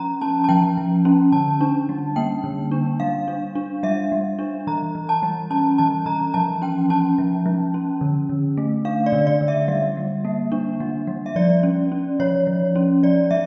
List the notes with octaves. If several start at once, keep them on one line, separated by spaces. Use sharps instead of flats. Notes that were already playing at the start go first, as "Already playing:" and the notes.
Already playing: F3 C#4 A#5
C#4 A5
A5
F3 G5
F3
C#4
D3 A5
D4
G3
A#3 G5
D3
D4
G3 F5
D4
D4
G3 E5
G3
D4
E3 A#5
E3
A5
G3
C#4 A5
E3 A5
E3 A#5
F3 A5
C#4 G5
C#4 A5
F3
F3
C#4
D3
D3
A3
D4 F5
D5
D3
D5
D3
E5
G3
G3
A#3
D4
G3
G3
E5
F3 D5
C#4
C#4
F3 C#5
F3
C#4
F3 D5
F3 E5